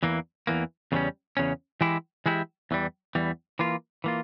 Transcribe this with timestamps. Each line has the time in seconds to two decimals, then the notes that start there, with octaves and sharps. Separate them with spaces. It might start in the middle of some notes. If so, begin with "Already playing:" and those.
0.03 E2 E3 A#3
0.47 E2 E3 A#3
0.92 E2 C#3 E3 G3 C#4
1.37 E2 C#3 C#4
1.81 E3 G#3 E4 G4
2.26 E3 G#3 E4 G4
2.71 E2 E3 G3
3.15 E2 E3 G3
3.59 E3 A#3 F4
4.04 E3 A#3 F4